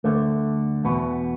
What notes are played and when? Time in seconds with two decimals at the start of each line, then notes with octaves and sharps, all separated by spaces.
0.04 D2 D3 A3
0.85 E2 B2 B3